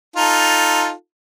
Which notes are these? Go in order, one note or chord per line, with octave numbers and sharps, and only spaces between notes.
D#4 F4 A4